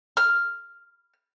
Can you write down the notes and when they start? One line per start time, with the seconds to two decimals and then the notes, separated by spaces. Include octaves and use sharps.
0.17 F6